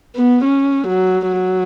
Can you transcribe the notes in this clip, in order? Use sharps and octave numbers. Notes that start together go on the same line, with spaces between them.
B3
C#4
F#3
F#3